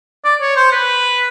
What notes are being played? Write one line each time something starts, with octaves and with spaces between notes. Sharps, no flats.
D5
C#5
C5
B4